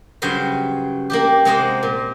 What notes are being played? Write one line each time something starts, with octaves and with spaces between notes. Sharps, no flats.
G2 C#3 F#3 C5 B5
A#3 D4 G4
C3 G#3 A#3 C5 D#5 F#5
A#2